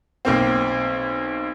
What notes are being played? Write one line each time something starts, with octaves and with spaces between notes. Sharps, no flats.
B1 A#3 C4